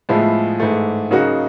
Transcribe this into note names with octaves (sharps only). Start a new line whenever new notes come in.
A2 F3 G#3 B3 E4
G#2 E3 A3
C#3 F#3 A#3 D#4 F#4